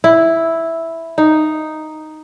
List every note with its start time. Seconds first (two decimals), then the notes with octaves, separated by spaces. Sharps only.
0.04 E4
1.18 D#4